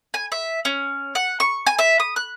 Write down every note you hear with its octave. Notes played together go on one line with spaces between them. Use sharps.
G#5
E5
C#4
F#5
C#6
G#5
E5
D#6
F#6